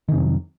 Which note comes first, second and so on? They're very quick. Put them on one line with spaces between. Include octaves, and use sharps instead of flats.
D#3 C3 F2 F#3